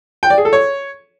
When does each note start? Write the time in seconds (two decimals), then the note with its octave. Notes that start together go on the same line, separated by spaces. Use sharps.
0.23 G5
0.30 D5
0.38 G#4
0.45 A4
0.53 C#5